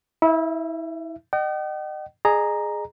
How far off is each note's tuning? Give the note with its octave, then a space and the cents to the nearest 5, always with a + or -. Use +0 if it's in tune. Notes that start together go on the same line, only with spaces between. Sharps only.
E4 -30 E5 +30
D#5 -35 G5 -45
G#4 +5 D#5 -45 A#5 +0